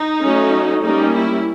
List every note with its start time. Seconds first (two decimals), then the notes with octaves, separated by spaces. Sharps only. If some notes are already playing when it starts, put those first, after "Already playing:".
Already playing: D#4
0.22 F#3 A3 C#4
0.82 G3 A#3 C#4 D#4
1.13 E4